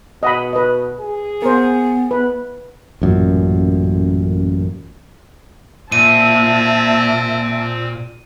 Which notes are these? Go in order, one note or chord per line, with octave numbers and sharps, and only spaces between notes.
B2 D#5 F#5 B5
B4 D#5
G#4
B3 A#4 C5
B4
A1 F#2 A#2
A#2 C4 E5 A5 D#7